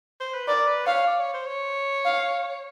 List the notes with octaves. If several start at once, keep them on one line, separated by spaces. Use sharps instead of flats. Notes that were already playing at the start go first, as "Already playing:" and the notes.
C5
B4
A#4 D5
B4
C#5 F5
D5
C#5
C5
C#5
F5